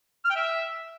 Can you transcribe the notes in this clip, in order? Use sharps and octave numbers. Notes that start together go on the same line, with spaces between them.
F6
G5
E5